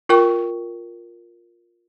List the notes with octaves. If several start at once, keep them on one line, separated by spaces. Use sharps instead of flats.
F4 A#4 G5 C#6